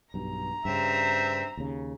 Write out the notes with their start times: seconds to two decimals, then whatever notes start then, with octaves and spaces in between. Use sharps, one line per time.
0.14 B1 G2 A#5
0.65 G2 C#3 C4 C5 E5
1.57 D#2 C#3